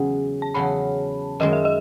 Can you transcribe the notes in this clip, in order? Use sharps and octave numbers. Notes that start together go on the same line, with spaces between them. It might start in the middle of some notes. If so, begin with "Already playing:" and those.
Already playing: E2 C#3 F#3 C#4
A5
E2 C#3 F#3 C#4 B5
F#2 D#3 G#3 D#4 D#5
E5
D#5